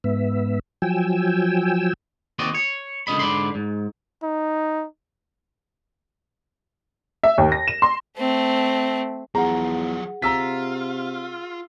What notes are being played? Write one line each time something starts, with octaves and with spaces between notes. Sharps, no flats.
G#2 B3 E5
F3 F#3 G5 G#5 E6
D#2 C4 F#4 D5 D#5
C#5
C#2 D3 D#5 B5
G#2 D3 D5 B5 C6
G#2
D#4
E5
D#2
A#6
E7
C6
A3 C4
E2 F3 F#3 G#4 F#5 A#5
C3 F4 A#5 E6 B6